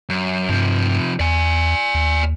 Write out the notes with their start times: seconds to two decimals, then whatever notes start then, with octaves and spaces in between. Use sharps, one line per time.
0.09 F#2
0.49 G2 C3 F3
1.20 E2 D5 G#5
1.95 D#2